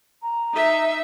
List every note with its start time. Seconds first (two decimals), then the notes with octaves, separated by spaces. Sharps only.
0.22 A#5
0.54 D#4 E5